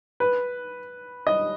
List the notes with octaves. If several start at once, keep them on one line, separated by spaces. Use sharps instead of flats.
B4
D#5